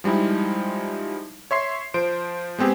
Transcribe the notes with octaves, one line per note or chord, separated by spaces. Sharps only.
F3 G3 G#3 D#4 E4
C#5 E5 C6 C7
F3 C5 D7
G#3 B3 C4 G4 G#4